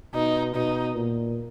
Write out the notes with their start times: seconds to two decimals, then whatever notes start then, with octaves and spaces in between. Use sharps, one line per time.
0.14 B2 D#4
0.55 B2 D#4
0.95 A#2